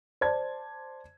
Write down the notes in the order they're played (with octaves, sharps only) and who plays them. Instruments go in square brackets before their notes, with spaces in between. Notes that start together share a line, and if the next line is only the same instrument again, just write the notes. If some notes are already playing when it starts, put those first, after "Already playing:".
[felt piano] C5 D5 A5 G#6